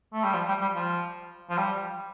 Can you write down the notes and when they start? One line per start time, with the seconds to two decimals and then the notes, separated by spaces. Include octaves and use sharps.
0.13 A3
0.24 G3
0.34 F3
0.48 G3
0.61 G3
0.76 F3
1.50 F3
1.58 G3